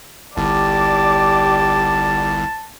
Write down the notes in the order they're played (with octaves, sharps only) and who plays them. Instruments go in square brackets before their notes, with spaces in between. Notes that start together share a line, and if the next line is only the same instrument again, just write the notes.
[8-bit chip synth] G1 C2 [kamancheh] G4 D5 [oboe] A5